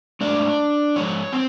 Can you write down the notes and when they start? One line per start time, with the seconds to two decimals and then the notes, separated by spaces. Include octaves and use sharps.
0.21 G#2 F3 A3 D4 D5
0.96 G#2 F3 C#5
1.33 C4 C5